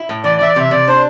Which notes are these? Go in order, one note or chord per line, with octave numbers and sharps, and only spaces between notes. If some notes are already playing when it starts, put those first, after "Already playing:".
Already playing: E4
A2
E3 D5
D5
E3 E5
D5
C3 E5
C3 D5
D4 C5